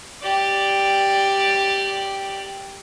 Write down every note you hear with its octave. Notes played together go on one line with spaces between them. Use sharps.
G4 D5